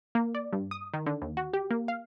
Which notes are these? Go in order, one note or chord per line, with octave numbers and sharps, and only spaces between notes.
A#3
D5
G2
D#6
D#3
D3
D#2
F#4
G4
A#3
F5